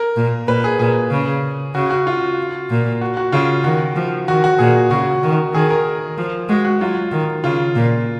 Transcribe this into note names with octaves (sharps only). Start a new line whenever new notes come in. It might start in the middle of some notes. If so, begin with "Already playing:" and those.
Already playing: A#4
A#2
A#2 B4
G#4
A#2 G#4
C#3
C#3 F#4
F#4
F4
A#2
F#4
F#4
C#3 F4
D#3 F#4
F3
D#3 F#4
F#4
A#2 G#4
C#3 F#4
D#3
D#3 G#4
A#4
F3
G#3 F#4
F#4
F#3 F4
D#3
C#3 F4
A#2